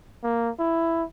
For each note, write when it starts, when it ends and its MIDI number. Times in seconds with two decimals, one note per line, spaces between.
0.24 0.50 58
0.59 1.04 64